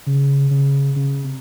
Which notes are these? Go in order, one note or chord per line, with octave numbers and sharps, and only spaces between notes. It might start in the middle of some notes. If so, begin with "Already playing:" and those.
C#3
C#3
C#3
C3